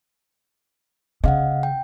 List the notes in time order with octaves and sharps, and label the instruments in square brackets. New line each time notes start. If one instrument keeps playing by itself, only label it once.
[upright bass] C#3 [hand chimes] D#5 F5 F#5
[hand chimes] G5